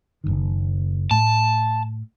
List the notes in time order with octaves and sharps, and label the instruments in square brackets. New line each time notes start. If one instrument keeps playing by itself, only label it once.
[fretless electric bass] F#1 C2 D#3
[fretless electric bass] A2 A3 [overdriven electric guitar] A5